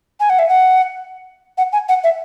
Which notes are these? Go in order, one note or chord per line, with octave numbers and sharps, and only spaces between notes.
G#5
F#5
E5
F#5
F#5
G#5
F#5
E5